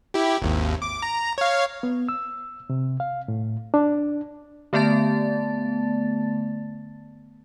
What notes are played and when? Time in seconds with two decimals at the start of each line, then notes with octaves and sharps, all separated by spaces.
0.14 E4 G4
0.42 G#1 D#2
0.82 D6
1.02 A#5
1.38 C#5 F5
1.83 B3
2.09 E6
2.70 C3
3.00 F5
3.28 A2
3.74 D4
4.73 D3 A3 B3 D5 A5 A6